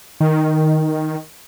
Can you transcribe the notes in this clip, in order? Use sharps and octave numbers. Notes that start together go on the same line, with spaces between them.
D#3